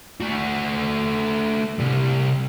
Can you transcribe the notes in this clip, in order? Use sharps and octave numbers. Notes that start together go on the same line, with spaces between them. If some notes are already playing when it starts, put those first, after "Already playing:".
A3 F#4
C2 G3